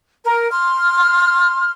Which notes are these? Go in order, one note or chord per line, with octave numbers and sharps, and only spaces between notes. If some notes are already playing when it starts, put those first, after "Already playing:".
A#4
C6 F6